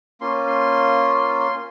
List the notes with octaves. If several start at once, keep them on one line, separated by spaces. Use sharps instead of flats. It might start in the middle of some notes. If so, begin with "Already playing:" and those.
A#3 C#4 F4 C6
C6
C6